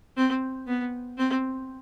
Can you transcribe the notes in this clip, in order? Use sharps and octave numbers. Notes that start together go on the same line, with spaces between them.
C4
B3
C4